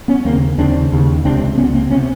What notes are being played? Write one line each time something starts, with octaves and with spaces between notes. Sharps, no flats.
B3 C#4
D#2 C#3 A#3 C4
D#2 C#3 C4 D4
D#2 C#3
C#2 C3 C4 D4
C#2 C3 B3 C#4
A#3 C4
C3 B3 C#4